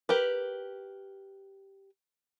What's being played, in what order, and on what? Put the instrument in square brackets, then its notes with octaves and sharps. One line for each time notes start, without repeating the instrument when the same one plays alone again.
[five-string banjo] G4 A#4 B4